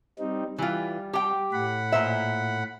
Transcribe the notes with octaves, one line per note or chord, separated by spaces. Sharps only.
G3 C4 D#4
E3 G3 F4
G4 G5
A2 F#5 B5
A#2 C5 E5